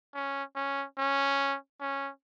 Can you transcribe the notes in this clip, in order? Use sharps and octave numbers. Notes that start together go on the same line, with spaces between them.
C#4
C#4
C#4
C#4